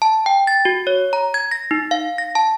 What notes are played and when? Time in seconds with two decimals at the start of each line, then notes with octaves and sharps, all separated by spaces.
0.02 A5
0.26 G5
0.47 A6
0.65 F#4
0.87 C#5
1.13 A#5
1.34 G#6
1.51 A#6
1.71 D#4
1.91 F5
2.18 A#6
2.35 A5